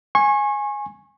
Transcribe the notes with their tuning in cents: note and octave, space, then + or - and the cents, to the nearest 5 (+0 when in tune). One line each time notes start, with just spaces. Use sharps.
G#5 +0 C#6 -35